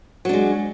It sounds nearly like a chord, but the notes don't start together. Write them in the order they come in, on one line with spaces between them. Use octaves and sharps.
F#3 D4 G#3